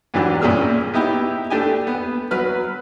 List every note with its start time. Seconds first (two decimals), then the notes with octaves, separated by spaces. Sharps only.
0.14 G#2 E3 F#3 D4 G4
0.41 G2 A#2 C#4 G#4 E6 F6
0.94 B3 D#4 E4 G4
1.50 A3 D4 G4 G#5
1.87 B3
2.31 F#3 B4 F6